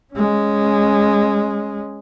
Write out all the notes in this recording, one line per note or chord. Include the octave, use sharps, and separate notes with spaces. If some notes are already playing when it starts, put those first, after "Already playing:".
G#3 C#4